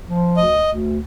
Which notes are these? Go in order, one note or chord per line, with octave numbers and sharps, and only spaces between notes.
F3
D2 D#5
D2